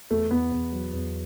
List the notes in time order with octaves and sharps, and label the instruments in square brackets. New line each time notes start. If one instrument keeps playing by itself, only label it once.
[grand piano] E2 [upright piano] A3
[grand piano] E2 [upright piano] B3
[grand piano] E2
F#3
E2